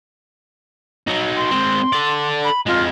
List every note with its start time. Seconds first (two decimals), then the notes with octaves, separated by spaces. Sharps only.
1.07 F#3 D#4
1.36 C6
1.51 G#3 C4
1.93 A4 D5
2.44 B5
2.66 F2 G#3 F4